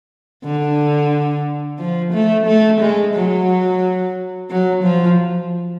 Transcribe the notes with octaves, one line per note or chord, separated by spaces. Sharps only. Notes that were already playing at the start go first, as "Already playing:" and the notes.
D3
F3
A3
A3
G#3
F#3
F#3
F3